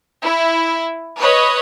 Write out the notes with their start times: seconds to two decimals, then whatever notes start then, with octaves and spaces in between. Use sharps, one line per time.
0.23 E4
1.20 B4 C#5 D#5